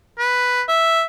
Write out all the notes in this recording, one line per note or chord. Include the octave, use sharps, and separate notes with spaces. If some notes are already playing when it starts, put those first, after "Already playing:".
B4
E5